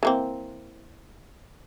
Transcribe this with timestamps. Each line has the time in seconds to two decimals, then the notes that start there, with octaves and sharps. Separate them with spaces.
0.03 E3 A#3 C4